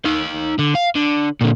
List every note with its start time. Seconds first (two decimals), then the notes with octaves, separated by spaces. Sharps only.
0.05 D#4 F5
0.59 D3
0.75 F5
0.96 D3
1.41 A#2 D3